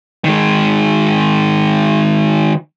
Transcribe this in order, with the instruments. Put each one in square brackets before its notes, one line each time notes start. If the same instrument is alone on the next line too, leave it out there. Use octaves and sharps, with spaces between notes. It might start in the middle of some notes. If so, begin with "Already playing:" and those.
[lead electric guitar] D#3 G#3